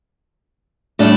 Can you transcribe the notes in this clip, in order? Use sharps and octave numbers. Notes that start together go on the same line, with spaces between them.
A2 G3 D4